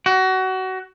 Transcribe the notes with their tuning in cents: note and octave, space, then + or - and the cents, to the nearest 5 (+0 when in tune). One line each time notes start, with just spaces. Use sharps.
F#4 +25